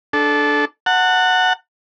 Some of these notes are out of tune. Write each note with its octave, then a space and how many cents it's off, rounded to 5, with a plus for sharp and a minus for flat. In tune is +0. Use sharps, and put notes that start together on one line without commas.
D4 +0 A4 -20
F#5 -5 A5 +40